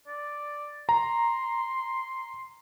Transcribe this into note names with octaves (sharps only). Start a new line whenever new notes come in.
D5
A#5 C6